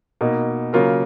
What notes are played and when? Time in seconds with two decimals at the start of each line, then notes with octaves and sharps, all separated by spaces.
0.21 B2 A#3 D#4
0.73 C#3 F#3 A#3 F4 A#4